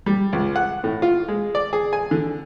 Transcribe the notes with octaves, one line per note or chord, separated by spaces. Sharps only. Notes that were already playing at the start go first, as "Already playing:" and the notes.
G3
C#2
F#5
A2
F4
G#3
D5
G#4
G#5
D3